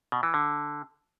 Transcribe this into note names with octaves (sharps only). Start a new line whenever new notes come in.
B2
E3
D3